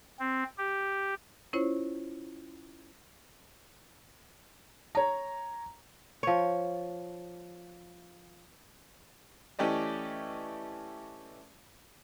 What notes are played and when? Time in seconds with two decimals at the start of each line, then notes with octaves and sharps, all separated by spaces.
0.19 C4
0.58 G4
1.53 C#4 E4 F4 C5 C#5
4.95 C#5 A#5
6.23 F3 C#5
9.59 E3 A3 C#4 G4 D5 D#5